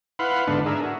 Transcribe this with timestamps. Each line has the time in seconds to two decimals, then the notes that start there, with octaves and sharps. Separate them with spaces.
0.19 E4 B4 F5 F#5 B5 C6
0.47 G#2 D3 B3 D4
0.66 D4 G#4 A#4 E5
0.83 F#4